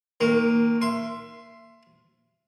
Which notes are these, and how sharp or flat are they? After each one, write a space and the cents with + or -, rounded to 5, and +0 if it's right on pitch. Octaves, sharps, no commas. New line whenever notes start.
D#3 +15 A#3 -10
E5 +25 C6 +0